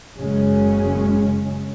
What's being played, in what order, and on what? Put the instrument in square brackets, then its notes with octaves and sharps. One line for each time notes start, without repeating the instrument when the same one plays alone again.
[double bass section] F#1 F#2 C#3 G#3 C#4